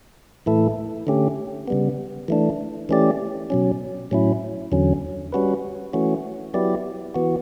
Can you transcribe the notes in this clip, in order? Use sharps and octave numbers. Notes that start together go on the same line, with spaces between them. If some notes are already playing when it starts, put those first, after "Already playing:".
A2 E3 A3 E4 A4
D3 A3 C#4 G4
C#3 G3 B3
E3 A3 D4
E3 A3 C#4 G4 D5
B2 F#3 C#4
A2 F#3 C#4 E4
E2 D3 F#3 C#4
G3 C#4 F#4 B4
E3 A3 C#4 F#4
F#3 B3 E4 G4 D5
E3 B3 F#4